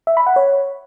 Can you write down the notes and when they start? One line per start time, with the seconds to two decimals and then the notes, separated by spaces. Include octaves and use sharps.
0.07 E5
0.17 B5
0.27 F#5
0.36 C#5